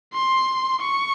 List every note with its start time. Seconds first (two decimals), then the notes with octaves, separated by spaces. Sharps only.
0.14 C6
0.81 C#6